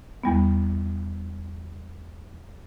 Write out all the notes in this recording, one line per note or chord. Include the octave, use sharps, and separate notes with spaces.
E2 G3 B3